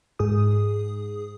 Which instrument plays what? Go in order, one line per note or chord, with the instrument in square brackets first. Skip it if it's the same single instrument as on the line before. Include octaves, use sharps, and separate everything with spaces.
[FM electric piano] G#2 G#4 D#6